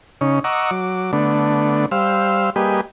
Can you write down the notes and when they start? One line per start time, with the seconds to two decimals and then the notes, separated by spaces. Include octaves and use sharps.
0.21 C#3 C#4 D#4
0.44 D#5 F#5 A#5 C#6 D6 E6
0.71 F#3 D6
1.13 D3 A3 B3 D4
1.91 G3 C5 F5 E6
2.56 G3 A#3 G4 G#4 B4 D#5